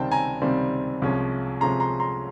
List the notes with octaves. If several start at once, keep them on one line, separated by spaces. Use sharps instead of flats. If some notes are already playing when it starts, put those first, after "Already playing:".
Already playing: C#2 C3 D#3 G3 C4 G5 A5
G#5 A#5
C#2 C3 D#3 G3 C4
C2 C3 F3 G#3 C#4
C2 C3 F3 G#3 C#4 A#5 C6
A#5 C6
A#5 C6